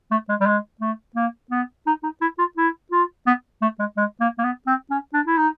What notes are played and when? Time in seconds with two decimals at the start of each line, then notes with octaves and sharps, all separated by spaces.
0.11 A3
0.29 G#3
0.40 G3
0.46 G#3
0.81 A3
1.16 A#3
1.51 B3
1.87 D#4
2.03 D#4
2.21 E4
2.38 F4
2.57 E4
2.92 F4
3.27 B3
3.61 A3
3.79 G#3
3.97 G#3
4.20 A#3
4.38 A#3
4.44 B3
4.67 C4
4.90 C#4
5.13 D4
5.27 E4
5.37 D#4